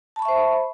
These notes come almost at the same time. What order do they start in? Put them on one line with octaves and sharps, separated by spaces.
A5 B5 C#6 E5 C5